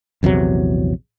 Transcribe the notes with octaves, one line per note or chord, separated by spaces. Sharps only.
A#1 E2 C3 F#3